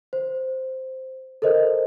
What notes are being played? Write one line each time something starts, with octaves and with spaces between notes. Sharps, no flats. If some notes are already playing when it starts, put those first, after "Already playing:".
C5
A4 A#4 C5 D#5